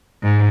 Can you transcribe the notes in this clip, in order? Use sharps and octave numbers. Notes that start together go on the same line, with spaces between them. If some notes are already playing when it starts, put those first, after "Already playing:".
G#2